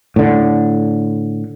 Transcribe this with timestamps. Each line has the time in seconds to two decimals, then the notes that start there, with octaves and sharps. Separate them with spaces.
0.16 A2 D3